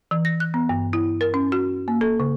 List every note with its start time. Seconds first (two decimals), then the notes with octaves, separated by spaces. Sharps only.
0.11 E3
0.25 A#6
0.40 F#6
0.54 B3
0.69 G2
0.93 E4
1.21 A#4
1.34 C#4
1.52 F#4
1.88 A#3
2.01 A4
2.20 C#3